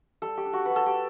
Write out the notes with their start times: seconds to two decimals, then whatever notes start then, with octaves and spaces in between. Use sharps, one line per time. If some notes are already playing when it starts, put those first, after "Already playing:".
0.22 G3 A4
0.37 G4
0.45 D4
0.53 F#4
0.66 F#3 B4
0.76 A4
0.86 G4